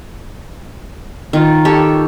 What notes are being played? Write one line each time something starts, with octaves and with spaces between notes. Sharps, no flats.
D#3 F4
G4 A4 C#5